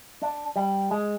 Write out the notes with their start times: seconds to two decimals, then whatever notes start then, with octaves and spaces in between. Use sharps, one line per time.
0.22 D4
0.56 G3
0.91 G#3